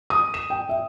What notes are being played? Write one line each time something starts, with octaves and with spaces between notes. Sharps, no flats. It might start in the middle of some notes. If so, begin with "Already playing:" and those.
D#6
E7
G5
E5